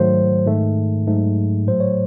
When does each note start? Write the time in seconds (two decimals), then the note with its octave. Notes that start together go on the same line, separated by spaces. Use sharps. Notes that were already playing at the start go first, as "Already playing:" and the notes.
Already playing: G#2 D#3 F#3 A3 C5
0.46 G#2 D#3 A3
1.07 G#2 F#3 A3
1.67 A2 F#3 A3 C5
1.80 C#5